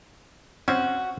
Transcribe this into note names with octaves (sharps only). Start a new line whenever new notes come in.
C4 C#4 F#4